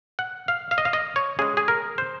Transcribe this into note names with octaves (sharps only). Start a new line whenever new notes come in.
F#5
F5
F5
D#5
F5
D#5
C#5
C#3 G#3 G#4
G#4
A#4
C5